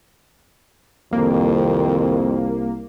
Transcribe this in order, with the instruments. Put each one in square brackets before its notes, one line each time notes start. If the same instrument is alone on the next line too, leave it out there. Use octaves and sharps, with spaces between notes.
[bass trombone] C2 [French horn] F2 [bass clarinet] D#3 [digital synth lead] A#3